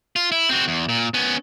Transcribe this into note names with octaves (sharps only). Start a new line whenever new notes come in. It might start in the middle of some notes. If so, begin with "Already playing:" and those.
F4
E4
C4 F#4
E2
A#2
B3 C#4